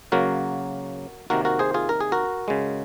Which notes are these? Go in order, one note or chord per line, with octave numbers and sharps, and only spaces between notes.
C#3 F#3 A#3 F#4 A#4
C3 D#3 A#3 F#4 A#4
F#4 A#4
G#4 C5
F4 G#4
A#4
G#4
F#4 A#4
C#3 G#3